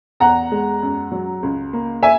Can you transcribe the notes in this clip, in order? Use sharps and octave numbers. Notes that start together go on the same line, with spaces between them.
E2 F#5 A#5
G#3
F#2
F#3
C#2
A#3
E5 G#5